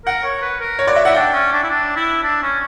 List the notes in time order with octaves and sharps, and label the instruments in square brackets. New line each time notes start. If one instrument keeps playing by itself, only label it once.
[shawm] A#4 [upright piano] F#5
[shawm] C#5
B4
A#4
[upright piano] C#5
[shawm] F#4 [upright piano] D5
[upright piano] E5
[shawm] E4 [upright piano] F#5
[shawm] D4 [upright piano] G5
[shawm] C#4
D4
E4
D4
E4
D4
C#4